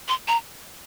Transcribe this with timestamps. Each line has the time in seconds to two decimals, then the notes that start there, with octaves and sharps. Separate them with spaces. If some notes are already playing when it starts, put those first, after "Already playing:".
0.08 C6
0.28 A#5